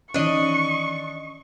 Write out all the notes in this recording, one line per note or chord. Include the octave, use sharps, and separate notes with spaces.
D#3 E3 C#4 D4 D#5 C#6